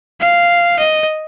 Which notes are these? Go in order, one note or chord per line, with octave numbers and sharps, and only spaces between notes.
F5
D#5